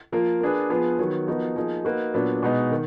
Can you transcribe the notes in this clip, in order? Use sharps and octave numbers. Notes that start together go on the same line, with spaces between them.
F3 A#3 F4 A#4
A#3 D4 G#4 B4
F3 B3 F4 G#4 B4
D#3 F#3 B3
F3 B3 D#4 F#4 A#4
F3 A#3 D#4 G#4
A#3 D#4 F#4 B4
A#2 F#3 B3 D4
B2 G#3 B3 D#4
D#3